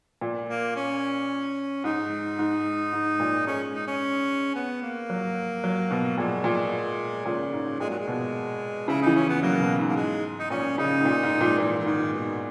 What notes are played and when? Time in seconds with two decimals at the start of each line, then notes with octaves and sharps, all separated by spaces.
0.21 A#2
0.49 A#3
0.76 C#4
1.84 G#2 D#4
2.39 G#2
2.93 G#2
3.20 A#2
3.47 G#3 C#4
3.74 D#4
3.87 C#4
4.55 B3
4.82 A#3
5.10 F#3
5.64 F#3
5.91 B2
6.18 A#2 G#3
6.44 A#2
7.25 A#2 C#3
7.53 G#2
7.80 A#2 G#3
7.90 F#3
8.00 G#3
8.07 B2
8.88 C#3 E4
9.02 E3 D#4
9.16 C#4
9.25 E3 B3
9.42 F#3 A#3
9.60 B2
9.79 G#2
9.89 A#3
9.96 G#3
10.39 D#4
10.50 A#2 C#4
10.78 C#3 D#4
11.00 G#2
11.05 A#2
11.23 G#2
11.41 A#2
11.59 A#2 E3
11.79 E3
11.86 G#2 D#3
12.13 B2